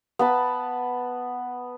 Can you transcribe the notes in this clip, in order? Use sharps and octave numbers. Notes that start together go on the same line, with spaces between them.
B3 A5 B5